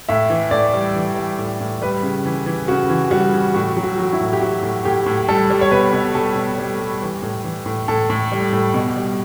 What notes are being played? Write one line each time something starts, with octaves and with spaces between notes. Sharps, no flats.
A2 E5
E3
A2 D5
G3
E3
G3
A2
A2
G3 B4
C#3
E3
E3
C#3 F#4
E3
G3 F#4
E3
A2 F#4
F#3
F#4
F#3
E4
A2
G4
F#3 F#4
A2
A2 G4
A2
G3 A4
G3
C#5
B2 B4
B2
G3 A4
B2
G3
G3
E3
A2
E3
A2
A2 A4
A2
G3
A2
B2
G3